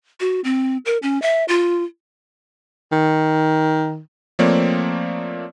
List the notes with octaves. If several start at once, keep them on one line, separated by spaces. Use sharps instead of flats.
F#4
C4
A#4
C#4
E5
F4
D#3
F3 A3 A#3 C4 C#5 D5